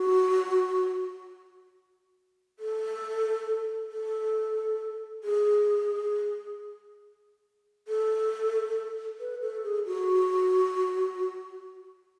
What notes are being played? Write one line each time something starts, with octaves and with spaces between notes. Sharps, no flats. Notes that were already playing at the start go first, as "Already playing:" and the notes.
Already playing: F#4
A4
A4
G#4
A4
B4
A4
G#4
F#4